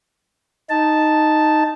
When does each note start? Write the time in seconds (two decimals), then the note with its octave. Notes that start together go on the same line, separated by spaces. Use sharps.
0.70 D#4 A5